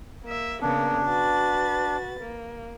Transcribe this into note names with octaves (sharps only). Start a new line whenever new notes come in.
A#3 E5
C#3 A#3 B3 D4
F#4 B4 A6
A#3